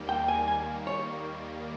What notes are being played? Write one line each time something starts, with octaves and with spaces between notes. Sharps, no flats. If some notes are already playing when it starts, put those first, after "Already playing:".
Already playing: D#2 D#3 G3 A#3
G5
G#5
G#5
C#5